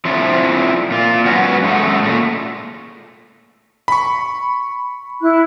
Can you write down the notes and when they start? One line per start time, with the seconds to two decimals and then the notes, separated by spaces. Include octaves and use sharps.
0.05 F3 A3 C4 D4 E4
0.90 A#2 F4
1.25 G#2 F#3 B3 C#4 F#4
1.63 F#2 G#3 A3 A4
2.03 A#2 A3
3.88 B5 C#6
5.22 E4 F#6